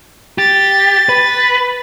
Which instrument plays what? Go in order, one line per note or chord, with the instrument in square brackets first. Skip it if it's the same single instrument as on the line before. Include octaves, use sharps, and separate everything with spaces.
[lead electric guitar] G4 [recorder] A6
[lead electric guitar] B4